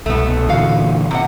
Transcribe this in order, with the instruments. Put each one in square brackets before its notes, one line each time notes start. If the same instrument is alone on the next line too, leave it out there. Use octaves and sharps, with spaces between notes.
[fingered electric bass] C2 B2 [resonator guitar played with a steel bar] A3 B3
[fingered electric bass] A#2 D3 E3 [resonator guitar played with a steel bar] F#4 F5
[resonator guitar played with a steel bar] C3 D5 F#5